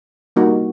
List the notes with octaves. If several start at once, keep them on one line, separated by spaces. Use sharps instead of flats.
G3 A#3 D#4 F#4